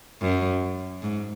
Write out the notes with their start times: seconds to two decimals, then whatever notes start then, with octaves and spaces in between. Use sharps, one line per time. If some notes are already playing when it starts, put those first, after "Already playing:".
0.21 F#2
1.02 G#2